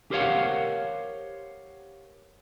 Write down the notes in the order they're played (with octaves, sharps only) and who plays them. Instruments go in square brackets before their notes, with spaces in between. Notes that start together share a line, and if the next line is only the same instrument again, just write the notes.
[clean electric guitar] G4 A#4 C5 C#5 F5 F#5